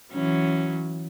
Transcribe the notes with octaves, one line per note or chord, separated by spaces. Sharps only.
E3 F#3 C#4